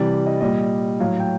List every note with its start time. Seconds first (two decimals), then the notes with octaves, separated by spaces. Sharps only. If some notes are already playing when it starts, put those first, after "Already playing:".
Already playing: C3 E3 G3 D5
0.26 D#5
0.41 A#2 G3 D#5
1.00 A2 F#3 F5
1.19 G5